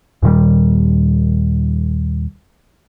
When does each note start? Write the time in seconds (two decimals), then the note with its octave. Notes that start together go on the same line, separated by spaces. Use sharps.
0.22 D#2 A#2 D#3 G3